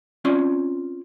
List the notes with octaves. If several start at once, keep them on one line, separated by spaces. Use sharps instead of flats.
C4 C#4 F4 D5 G#5